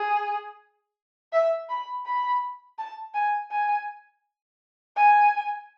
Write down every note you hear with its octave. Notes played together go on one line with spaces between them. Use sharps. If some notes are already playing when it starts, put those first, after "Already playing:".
Already playing: G#4
E5
B5
B5
A5
G#5
G#5
G#5